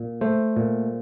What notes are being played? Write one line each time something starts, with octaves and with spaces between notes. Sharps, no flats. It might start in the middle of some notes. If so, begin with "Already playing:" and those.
Already playing: A#2
A3 C5
A#2